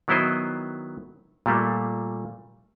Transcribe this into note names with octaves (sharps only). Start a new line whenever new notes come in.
D#3 F#3 B3 E4 C5 D#5
A#2 G3 A3 A#3